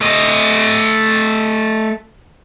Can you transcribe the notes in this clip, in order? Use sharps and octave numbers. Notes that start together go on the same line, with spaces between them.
A3 D#5